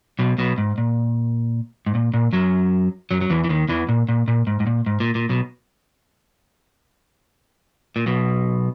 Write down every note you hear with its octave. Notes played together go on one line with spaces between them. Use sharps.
B1 B2
B1 B2
G#2
A#2
G#2
A#2
A#2
F#2 F#3
F#2 F#3
F#3
E2 E3
E3
D#2 D#3
E2 E3
A#2
A#2
A#2
G#2
G#2
A#2
G#2
A#2
A#2
B1 B2
A#2
B1 B2